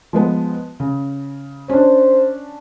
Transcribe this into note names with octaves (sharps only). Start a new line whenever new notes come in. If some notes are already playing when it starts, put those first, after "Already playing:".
F3 G#3 B3
C#3
C#4 D4 C5